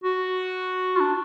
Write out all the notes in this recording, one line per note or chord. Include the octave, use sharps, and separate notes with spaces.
F#4
F4
D4